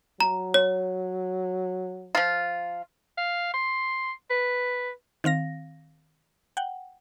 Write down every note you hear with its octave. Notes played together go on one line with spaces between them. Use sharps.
F#3 A#5
C#5
F3 F4
F5
C6
B4
D#3 C4 F5 A#6
F#5 G5